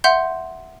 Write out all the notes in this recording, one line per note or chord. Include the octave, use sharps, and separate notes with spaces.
E5 F#5 C6 G6